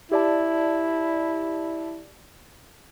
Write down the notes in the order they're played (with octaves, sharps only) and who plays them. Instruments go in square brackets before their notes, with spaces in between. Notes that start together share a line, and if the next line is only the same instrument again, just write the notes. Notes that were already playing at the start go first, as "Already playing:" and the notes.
[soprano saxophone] E4 [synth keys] G4 D5 A5